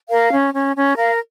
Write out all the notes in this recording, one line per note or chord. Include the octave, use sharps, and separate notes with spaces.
A#4 F5
C#4
C#4
C#4
A#4 F5